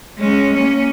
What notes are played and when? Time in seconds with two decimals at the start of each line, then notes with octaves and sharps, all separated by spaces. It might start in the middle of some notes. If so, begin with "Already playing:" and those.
0.18 G#3 C#4
0.53 A#3 C#4